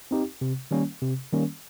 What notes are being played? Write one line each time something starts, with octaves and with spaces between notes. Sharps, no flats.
C4 D#4 G4
C3
D#3 G3 A#3 C#4
C3
D#3 G3 A#3 C#4